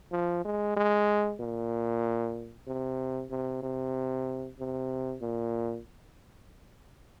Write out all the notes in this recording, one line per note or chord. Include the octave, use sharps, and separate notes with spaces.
F3
G#3
G#3
A#2
C3
C3
C3
C3
A#2